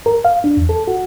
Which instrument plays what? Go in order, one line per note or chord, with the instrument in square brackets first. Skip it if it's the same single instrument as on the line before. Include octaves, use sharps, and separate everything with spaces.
[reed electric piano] A#4
F5
D4
E2
A4
F#4